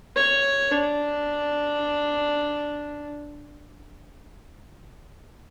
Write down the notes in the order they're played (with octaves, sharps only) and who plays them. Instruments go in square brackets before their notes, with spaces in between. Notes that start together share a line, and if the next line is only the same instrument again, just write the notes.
[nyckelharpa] C#5
D4